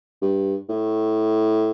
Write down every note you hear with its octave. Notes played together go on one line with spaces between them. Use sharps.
G2
A2